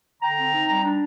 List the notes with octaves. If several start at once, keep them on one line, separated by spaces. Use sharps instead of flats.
D3 G5 A#5
C4
D#4
G3
D4